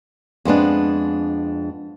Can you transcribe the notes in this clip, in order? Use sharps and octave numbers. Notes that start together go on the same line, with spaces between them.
F2 G#3 B3 D4